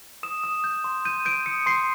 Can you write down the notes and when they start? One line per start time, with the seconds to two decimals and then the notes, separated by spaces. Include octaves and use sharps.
0.23 D#6 E7
0.44 D#6
0.64 G6
0.84 C6
1.05 G6 D#7
1.25 G6 D7
1.46 D#6 C#7
1.66 C6 C7